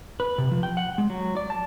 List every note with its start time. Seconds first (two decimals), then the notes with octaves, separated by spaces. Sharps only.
0.20 B4
0.38 C3
0.51 F3
0.63 G5
0.77 F#5
0.98 G#3
1.10 F#3
1.37 D5
1.50 A5